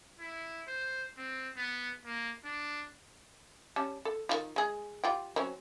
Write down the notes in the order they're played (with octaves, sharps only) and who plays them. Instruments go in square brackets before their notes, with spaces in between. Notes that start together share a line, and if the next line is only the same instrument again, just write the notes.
[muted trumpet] E4
C5
C4
B3
A#3
D4
[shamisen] G3 C#4 A5
A4
D#3 E4 F4
G#3 G#4
G3 F4 G5
F#3 C4 C#4